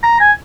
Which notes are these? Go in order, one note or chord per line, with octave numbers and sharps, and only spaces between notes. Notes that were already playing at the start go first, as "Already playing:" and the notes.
A#5
G#5